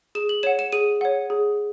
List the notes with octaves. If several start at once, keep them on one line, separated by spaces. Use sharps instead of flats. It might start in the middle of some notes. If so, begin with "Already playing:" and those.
G#4 E7
F#7
C#5 F#5 E7
E7
G#4 D#7
C#5 F#5
G#4